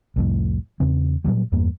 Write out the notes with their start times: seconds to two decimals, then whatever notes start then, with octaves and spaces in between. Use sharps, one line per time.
0.16 C2 F2 A2
0.80 E2 C#3 C4
1.24 A#2 C#3 F#3 G3
1.52 E2 G2 A#3